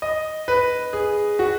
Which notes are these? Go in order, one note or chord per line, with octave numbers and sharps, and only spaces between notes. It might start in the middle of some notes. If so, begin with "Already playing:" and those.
D#5
B4
G#4
F#4